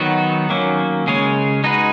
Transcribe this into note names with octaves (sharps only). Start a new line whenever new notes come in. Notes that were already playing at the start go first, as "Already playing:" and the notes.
Already playing: D#3 F#3 B3 D#4 F#4
D#3 F#3 A#3 C#4
C#3 G#3 C#4 G#4 C#5
G#3 D#4 F#4 B4